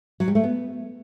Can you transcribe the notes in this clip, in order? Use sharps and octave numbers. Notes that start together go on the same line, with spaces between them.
F#3
G3
A3
B3